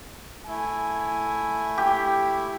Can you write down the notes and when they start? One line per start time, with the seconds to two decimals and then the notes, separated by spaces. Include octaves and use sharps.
0.47 A3 E4 G#5
1.78 G4